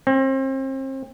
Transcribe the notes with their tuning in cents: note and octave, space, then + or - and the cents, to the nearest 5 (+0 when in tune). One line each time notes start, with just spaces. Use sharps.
C4 +35